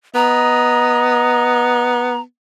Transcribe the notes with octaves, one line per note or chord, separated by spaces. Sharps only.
B3 D#5 A#5